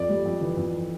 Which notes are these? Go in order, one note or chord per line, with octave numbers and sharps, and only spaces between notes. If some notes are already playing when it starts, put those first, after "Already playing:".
Already playing: F2 D5
G3
F2
E3
F2